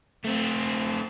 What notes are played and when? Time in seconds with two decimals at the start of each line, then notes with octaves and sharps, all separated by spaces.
0.25 A3 C4